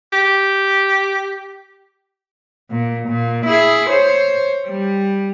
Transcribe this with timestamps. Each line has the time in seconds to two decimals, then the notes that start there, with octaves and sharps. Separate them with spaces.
0.13 G4
2.71 A#2
3.08 A#2
3.46 E4 G#4
3.89 C5 C#5
4.68 G3